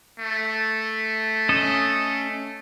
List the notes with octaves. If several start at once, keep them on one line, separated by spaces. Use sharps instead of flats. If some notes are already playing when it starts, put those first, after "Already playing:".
A3
C#4 A4 D#5